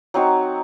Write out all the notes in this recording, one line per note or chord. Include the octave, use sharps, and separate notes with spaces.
F#3 C4 D#4 F#4